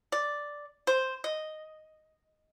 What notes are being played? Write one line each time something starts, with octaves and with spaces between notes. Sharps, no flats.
D5
C5
D#5